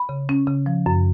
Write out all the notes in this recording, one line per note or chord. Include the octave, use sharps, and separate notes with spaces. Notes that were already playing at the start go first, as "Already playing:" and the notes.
Already playing: B5
C#3
C#4
C#3
F3
F#2